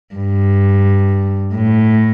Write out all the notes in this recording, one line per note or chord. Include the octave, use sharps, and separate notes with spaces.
G2
A2